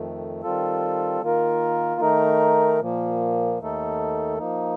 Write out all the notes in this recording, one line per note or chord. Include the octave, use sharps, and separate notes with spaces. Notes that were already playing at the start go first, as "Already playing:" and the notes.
Already playing: F2 D#3 A3
D#3 G3 C4 F4 A4
D#3 A#3 F4 A#4
D#3 A3 D#4 A#4
A#2 F3 A#3
D#2 D#3 A3 D#4 A4
F3 A#3 D#4